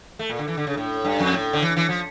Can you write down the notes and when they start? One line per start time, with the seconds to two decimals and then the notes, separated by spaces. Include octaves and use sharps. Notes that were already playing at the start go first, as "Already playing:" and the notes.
0.19 A3
0.29 A#2
0.39 D3
0.48 E3
0.57 D3
0.67 C#3
0.77 A2
1.05 G2
1.19 F2
1.33 A2
1.53 D3
1.62 E3
1.77 E3
1.89 F3